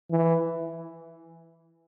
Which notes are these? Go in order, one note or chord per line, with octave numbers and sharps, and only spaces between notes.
E3